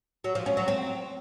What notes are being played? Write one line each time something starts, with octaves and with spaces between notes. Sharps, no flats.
F#3
F3
C#4
F#3
C4